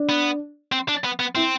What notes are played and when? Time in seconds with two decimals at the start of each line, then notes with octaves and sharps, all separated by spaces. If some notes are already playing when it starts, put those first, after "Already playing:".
Already playing: D4
0.09 B3
0.72 C4
0.88 D4
1.04 B3
1.19 B3
1.35 C4 E4